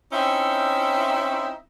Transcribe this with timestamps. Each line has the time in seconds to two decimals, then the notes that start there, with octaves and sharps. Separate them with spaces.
0.13 C4 C#4 D#4 E4 E5